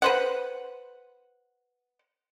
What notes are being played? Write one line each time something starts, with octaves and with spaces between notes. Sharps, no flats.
B4 C5 F#5